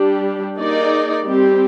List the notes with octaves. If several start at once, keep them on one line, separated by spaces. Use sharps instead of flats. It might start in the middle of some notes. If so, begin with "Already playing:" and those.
Already playing: G3 D4 G4
A#3 D#4 G#4 D5
G3 C4 G4